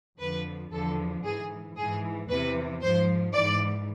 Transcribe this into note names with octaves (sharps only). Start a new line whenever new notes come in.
F2 D3 F3 B4
E2 D3 F3 A4
G#2 E3 G#4
G#2 E3 G#4
E2 C3 E3 B4
G#2 F3 C5
G#2 E3 D5